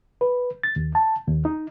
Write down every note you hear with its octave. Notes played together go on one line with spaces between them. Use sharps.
B4
A6
D#2
A5
D#2
D#4